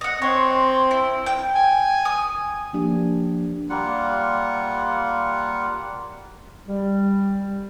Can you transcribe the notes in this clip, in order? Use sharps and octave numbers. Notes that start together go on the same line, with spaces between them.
D#5 F#5
C4 C#5 C6
E4
G5
G#5
D#6
F3 A#3 D4 G4
G3 A#3 F4 F#5
G3